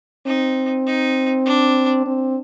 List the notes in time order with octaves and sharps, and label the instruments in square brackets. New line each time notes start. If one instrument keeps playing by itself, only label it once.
[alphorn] C4 [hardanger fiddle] D#4
[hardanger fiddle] D#4
D4
[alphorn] C4